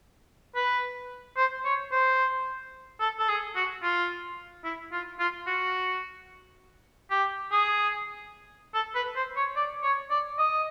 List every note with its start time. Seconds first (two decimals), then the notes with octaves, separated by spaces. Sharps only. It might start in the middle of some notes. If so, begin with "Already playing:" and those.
0.55 B4
1.37 C5
1.65 C#5
1.92 C5
3.01 A4
3.20 A4
3.29 G#4
3.56 F#4
3.83 F4
4.65 E4
4.92 F4
5.19 F4
5.47 F#4
7.10 G4
7.52 G#4
8.75 A4
8.95 B4
9.16 C5
9.36 C#5
9.56 D5
9.83 C#5
10.10 D5
10.39 D#5